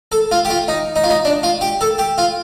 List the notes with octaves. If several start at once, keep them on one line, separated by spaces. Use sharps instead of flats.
A4
F4
G4
F4
D#4
D#4
F4
D#4
D4
F4
G4
A4
G4
F4